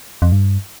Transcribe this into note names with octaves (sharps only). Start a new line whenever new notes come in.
F2
G2